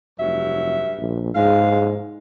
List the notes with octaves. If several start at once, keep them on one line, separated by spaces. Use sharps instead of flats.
F1 G2 F#3 E5
A#1
G#2 G#3 F5